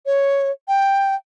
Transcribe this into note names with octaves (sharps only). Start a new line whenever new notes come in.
C#5
G5